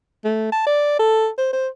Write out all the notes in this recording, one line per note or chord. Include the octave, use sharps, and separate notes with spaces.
A3
A5
D5
A4
C5
C5